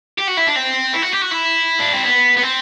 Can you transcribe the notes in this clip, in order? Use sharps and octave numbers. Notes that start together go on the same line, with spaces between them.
G4
F#4
E4
D4
C4
E4
F#4
G4
F#4
E4
D4
C4
B3
B3
C4